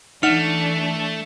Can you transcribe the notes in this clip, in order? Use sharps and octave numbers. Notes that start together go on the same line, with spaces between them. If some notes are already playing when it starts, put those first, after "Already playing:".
E3 A3 D4 D#4 F#5 F6 C#7 F7